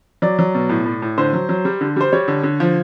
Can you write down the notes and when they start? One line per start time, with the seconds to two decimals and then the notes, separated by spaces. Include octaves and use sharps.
0.22 F#3 D5
0.39 F#3
0.54 B2
0.69 A2
0.86 A2
1.02 A2
1.18 D3 C5
1.33 F#3
1.49 F#3
1.65 G3
1.81 D3
1.96 G3 C5
2.12 G3 C#5
2.28 D3
2.43 D3
2.60 F3